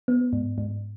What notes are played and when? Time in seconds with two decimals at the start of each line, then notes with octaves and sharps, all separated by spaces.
0.08 B3
0.33 G#2
0.58 G#2